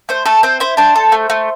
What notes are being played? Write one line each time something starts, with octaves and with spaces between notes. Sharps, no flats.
A3 C5
A3 A4
C4 C5
E4 C5
D4 C5
A4
A3
A3